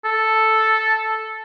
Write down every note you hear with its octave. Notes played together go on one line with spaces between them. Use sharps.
A4